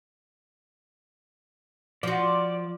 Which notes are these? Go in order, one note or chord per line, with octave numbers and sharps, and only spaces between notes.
F3 F#4 D5